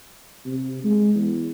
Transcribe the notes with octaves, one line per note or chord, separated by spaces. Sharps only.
C3
G#3
E2